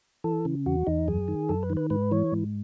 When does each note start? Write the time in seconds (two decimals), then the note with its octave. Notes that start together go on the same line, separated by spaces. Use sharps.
0.24 E3 A4
0.45 C#3
0.66 E2 F#4
0.87 E2 D#4
1.08 F#2 G#4
1.28 D#3
1.49 F#2 A4
1.63 B4
1.70 D#3
1.77 B4
1.90 G#2 B4
2.11 E3 C#5
2.32 G#2